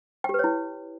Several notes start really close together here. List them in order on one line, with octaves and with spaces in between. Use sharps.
G5 G4 B4 C#5 E4